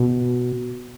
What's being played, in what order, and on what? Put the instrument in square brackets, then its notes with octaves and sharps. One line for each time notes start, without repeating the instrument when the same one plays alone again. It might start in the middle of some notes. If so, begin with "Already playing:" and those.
Already playing: [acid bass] B2